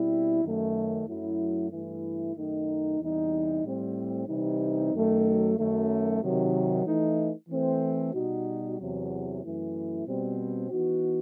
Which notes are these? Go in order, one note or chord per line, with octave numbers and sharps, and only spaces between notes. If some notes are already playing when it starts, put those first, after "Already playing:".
Already playing: B2 G3 C4 E4
F#2 D#3 A3
F#2 F#3 A3 E4
G2 E3 A3 E4
F#2 D#3 A3 D#4
E2 C3 E3 G3 D#4
A2 G3 C4
C3 E3 G3 C4 D#4
F#2 D#3 F#3 A3
F#2 D#3 A3
C3 D#3 F#3
E3 A3 D#4
E3 A3 C4
B2 G3 D#4 F#4
E2 C3 F#3
F#2 E3 A3 E4
B2 G3 C4
E3 B3 D#4 F#4